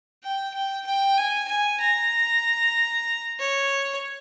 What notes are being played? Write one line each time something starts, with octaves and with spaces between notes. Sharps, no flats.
G5
G5
G5
G#5
G#5
A#5
C#5